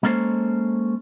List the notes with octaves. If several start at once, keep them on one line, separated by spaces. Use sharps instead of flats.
G#3 A#3 C#4 A4 C5